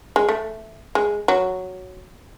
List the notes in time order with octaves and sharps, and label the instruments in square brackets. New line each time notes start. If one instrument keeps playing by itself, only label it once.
[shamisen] G#3
A3
G#3
F#3